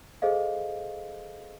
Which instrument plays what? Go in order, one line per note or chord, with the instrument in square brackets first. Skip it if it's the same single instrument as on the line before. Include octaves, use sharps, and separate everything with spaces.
[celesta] G#4 A4 C5 D#5 F5